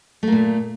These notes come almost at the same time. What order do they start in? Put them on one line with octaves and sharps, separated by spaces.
A3 A#3 A#2